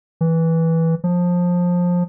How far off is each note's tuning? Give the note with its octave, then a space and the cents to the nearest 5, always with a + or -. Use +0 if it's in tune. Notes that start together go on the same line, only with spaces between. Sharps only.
E3 -10
F3 +20